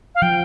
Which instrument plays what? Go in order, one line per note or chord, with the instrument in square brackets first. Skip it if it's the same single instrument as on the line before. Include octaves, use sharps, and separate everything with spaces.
[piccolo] F5
[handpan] F3 [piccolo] G5